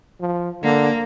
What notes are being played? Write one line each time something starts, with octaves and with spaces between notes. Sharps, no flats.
F3
D3 A#3